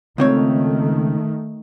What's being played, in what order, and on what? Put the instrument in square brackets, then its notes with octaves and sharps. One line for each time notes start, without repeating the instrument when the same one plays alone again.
[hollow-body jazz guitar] C#2 C4 C#5 [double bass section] D#3 A3